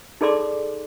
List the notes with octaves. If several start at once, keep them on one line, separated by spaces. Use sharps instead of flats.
D#4 G#4 A4 D5 C6 D6